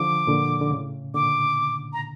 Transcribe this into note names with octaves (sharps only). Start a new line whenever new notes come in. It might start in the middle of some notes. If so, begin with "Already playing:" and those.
Already playing: D3 F3 D6
A#2 D3
D3
A2 C#3
A#2 D3 D6
A#5